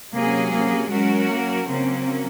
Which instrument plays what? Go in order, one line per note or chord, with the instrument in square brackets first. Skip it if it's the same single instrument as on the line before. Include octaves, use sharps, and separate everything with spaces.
[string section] C3 F#3 C#4 G#4 [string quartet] A#3
[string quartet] A#3
[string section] F#3 C#4 F#4 A#4 [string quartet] G#3
[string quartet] A#3
[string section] C#3 F#3 A#3 C#4 [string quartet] C4